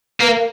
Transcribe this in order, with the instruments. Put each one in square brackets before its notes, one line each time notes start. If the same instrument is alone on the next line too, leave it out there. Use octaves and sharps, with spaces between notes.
[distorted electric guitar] A#3 [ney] B4
[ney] A#4